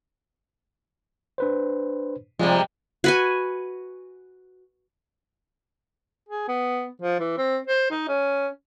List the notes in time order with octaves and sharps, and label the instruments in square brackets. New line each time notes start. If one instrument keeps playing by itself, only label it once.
[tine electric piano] D4 B4 C5
[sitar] C3 G3 G#3 [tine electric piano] F3 F4 D5
[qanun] F#4 B4 G#5
[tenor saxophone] G#4
B3
F3
E3
C4
C5
D#4
C#4